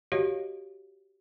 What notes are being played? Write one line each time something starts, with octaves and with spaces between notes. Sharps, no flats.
F#4 G4 C#5 D#5 F5